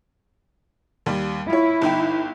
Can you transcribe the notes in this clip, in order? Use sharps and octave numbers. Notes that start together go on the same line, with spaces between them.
D#2 G3
E4 F4 C#5
G1 D#4 G5